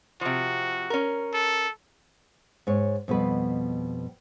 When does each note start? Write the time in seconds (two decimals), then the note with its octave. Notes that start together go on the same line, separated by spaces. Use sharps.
0.21 C3 F3 F#4
0.90 C#4 A#4
1.34 A4
2.67 G#2 C#5
3.08 F2 B2 G3 B4